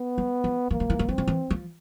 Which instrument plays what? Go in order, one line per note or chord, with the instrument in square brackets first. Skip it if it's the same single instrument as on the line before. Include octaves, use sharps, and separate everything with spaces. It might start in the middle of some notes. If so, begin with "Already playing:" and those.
Already playing: [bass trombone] B3
[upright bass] F#3
F3
[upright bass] E3 [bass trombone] A#3
[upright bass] F3
E3
F3
[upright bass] E3 [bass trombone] C4
[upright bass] F3
E3
F3